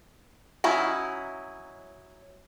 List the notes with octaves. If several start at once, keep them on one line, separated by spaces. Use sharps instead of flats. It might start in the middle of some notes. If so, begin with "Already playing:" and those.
F#3 C#4 D#4 E4